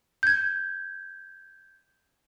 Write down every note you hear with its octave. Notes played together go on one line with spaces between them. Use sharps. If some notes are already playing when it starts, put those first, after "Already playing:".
G6 G#6